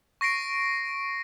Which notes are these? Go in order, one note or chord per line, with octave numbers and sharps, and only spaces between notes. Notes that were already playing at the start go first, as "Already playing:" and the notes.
C#6 A#6 C7 D7